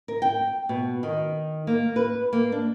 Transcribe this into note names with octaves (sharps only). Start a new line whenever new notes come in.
A#4
G5
B2
D#3
A#3
B4
A#3
D4